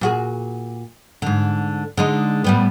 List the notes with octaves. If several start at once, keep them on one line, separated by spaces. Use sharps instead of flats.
A#2 F#4 G#4
G#2 D3
D3 G#3 D#4
A2 G3 B3